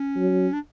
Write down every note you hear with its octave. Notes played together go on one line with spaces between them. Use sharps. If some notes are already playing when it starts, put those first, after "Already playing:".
Already playing: C#4
F#3
D4